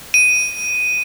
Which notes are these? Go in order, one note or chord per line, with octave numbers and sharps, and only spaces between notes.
D#7